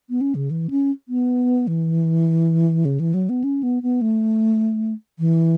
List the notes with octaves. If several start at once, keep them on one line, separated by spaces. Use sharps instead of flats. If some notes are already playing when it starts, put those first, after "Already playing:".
B3
C#4
C#3
E3
C#4
B3
E3
C#3
E3
F#3
B3
C#4
B3
B3
A3
E3